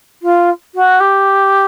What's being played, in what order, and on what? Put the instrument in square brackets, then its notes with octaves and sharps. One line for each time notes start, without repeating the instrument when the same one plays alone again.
[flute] F4
F#4
G4